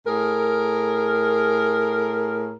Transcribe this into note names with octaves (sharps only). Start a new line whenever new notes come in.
A2 G#4 A#4